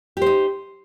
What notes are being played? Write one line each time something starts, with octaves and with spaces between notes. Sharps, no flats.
D#4 G4 C5